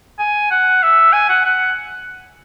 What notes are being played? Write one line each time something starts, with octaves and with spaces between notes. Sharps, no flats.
G#5
F#5
E5
G#5
F#5
F#5